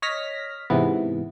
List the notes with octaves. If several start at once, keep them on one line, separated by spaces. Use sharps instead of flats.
C#5 D#5 F6 A#6 B6
G#2 C3 E3 B3